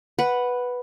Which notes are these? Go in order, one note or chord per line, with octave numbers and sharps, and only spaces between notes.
B4 F#5